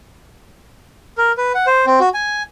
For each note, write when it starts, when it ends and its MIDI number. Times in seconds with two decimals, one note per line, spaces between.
1.18 1.32 70
1.38 1.52 71
1.55 1.66 78
1.67 1.85 72
1.87 2.00 60
2.00 2.09 66
2.14 2.43 80